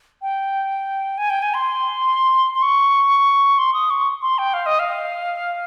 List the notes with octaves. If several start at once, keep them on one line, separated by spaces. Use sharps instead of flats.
G5
G#5
G5
G#5
C6
C6
C#6
C6
D#6
C#6
C6
G5
F5
D#5
F5